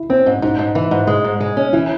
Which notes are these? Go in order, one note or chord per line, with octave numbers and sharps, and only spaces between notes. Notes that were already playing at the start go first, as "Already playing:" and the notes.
Already playing: E4
C4 C#4
G#2
G#2 D#4
G#2
E3
G#2
G#3
G#2
G#3
C#4
E3 E4